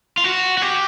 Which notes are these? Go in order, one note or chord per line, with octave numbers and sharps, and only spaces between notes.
F4
F#4
F#4
G4